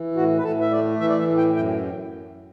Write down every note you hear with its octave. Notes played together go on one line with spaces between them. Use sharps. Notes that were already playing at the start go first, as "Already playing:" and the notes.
Already playing: E3
A2 F#4
B4
A2 A4
E5
A3 D5
E3 E5
D5
E5
A2
G5
F#2 G5